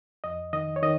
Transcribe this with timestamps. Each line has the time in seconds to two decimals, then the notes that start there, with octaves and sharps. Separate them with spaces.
0.24 F2 D#5
0.53 D#3 D#5
0.76 C#5
0.82 D#3 D#5